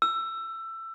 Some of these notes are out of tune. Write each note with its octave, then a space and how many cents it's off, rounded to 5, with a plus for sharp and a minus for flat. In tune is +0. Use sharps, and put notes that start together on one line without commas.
E6 +20